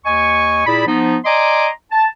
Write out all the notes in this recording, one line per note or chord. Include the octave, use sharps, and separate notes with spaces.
D#2 D#5 G#5 C#6
A#2 E4 G#4 D5 B5
F3 B3 D#4
D5 D#5 G#5 A#5 C6 D6
A5